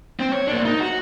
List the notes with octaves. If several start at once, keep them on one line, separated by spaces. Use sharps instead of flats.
C4
C#5
A#3 D4
D#4
F#4